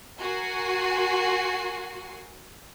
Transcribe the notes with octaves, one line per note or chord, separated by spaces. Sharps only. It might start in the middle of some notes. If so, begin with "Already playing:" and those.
F#4 A#4 G#5 C7